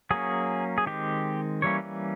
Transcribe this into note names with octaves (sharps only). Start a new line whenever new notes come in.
F#3 A#3 C#4 G#4
G#4
D#3 G#3 C4 G4
E3 G3 A#3 C#4 C#5